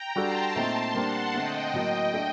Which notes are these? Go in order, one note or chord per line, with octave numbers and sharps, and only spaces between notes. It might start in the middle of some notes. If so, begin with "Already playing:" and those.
Already playing: G5 A#5
G3 D4 F#4 A4 A5 C6
A#2 A3 C4 D#4
G3 A#3 D4 G4 C5 F#5 A5
D3 A3 C4 D#5 G5
A2 F#3 A#3
A3 D4 A4